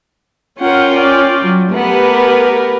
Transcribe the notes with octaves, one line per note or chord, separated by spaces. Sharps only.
C#4 F4 A#4 F#5 G5
D5
F#3
A3 B3 G4 A#4 B4